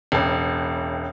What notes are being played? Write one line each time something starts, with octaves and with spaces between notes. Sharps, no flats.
E1 A1